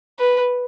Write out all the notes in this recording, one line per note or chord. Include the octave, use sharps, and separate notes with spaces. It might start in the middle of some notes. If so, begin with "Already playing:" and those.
B4